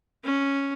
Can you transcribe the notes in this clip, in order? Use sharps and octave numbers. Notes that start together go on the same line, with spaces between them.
C#4